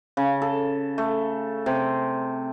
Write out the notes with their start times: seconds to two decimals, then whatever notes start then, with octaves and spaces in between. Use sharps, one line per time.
0.17 C#3
0.42 A4
0.98 A3
1.66 C3